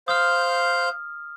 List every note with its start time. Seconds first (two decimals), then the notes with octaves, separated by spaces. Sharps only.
0.08 C5 F5 D#6 F6 G6